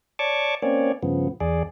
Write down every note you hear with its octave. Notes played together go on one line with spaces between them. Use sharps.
C#5 D5 A5 C#6 D6
A#3 C4 C#4 C#5 D5
G2 C#3 F3 B3
E2 G#4 D5